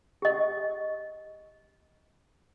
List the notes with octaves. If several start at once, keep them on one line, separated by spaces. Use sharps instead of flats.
G4 D#5